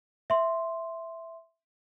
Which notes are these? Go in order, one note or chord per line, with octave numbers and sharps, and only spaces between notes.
E5 C6